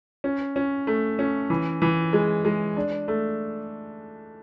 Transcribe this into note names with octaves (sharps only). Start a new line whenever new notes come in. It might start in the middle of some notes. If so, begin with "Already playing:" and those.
C#4
C#4
A3
C#4
E3
E3
G#3
G#3
D4
A3